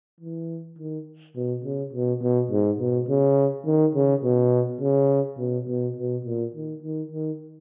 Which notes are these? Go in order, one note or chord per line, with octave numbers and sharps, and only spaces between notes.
E3
D#3
B2
C#3
B2
B2
G#2
B2
C#3
D#3
C#3
B2
C#3
B2
B2
B2
A#2
D#3
D#3
D#3